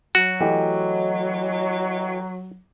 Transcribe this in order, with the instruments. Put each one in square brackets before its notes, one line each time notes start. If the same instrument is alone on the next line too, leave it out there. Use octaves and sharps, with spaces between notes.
[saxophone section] F#3 [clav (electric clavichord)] F#4
[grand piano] E3 A3 G4 [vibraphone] D#5